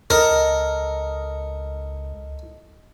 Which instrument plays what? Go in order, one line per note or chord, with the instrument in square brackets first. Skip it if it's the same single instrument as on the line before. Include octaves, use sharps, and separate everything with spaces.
[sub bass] C#2 [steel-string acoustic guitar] A4 D#5 [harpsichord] A#4